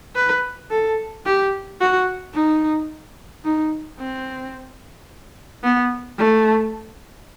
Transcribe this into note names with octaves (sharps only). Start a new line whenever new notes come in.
B4
A4
G4
F#4
D#4
D#4
C4
B3
A3